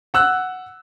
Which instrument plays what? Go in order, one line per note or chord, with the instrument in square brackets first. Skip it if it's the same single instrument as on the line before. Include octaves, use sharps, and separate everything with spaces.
[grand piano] F#5 E6 F#6